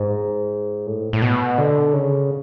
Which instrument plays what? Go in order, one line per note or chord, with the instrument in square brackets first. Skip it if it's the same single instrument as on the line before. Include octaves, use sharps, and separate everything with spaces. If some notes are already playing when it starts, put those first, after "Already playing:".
Already playing: [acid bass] G#2
A2
A2
B2
D3
C#3